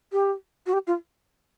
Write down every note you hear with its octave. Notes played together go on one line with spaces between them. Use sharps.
G4
F#4
G4
F4